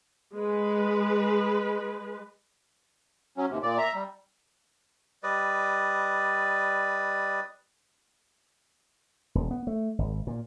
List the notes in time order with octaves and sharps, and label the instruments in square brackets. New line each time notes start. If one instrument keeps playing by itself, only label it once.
[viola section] G#3 B4
[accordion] F#3 C#4
D#2 C3
A#2 D5
E5 A#5
G3
[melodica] G3 B4 D5 D#5
[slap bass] D#1
B3
A3
G#1
A#2